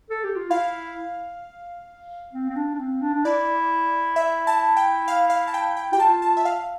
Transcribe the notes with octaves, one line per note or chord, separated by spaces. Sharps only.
A4
G4
F4
E4 F5
C4
C4
D4
D4
C4
D4
D4
E4 D5
E5
A5
G5
F5
F5
A5
G5
G5
G4 G5
F4 A5
A5
E5
F5